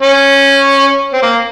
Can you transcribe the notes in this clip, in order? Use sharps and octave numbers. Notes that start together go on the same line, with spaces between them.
C#4
C4
A#3